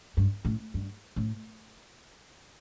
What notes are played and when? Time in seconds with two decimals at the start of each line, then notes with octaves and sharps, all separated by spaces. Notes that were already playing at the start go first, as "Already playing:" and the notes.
0.17 G2
0.45 A2
0.74 G2
1.16 A2